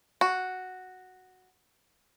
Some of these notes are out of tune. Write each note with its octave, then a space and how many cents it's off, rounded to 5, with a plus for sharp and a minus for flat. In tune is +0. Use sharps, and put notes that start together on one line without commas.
F#4 +0